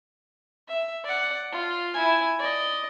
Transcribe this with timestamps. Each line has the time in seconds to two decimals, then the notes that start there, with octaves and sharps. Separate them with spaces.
0.68 E5
1.04 D5 F#5
1.52 F4
1.94 E4 G#5
2.39 D5 D#5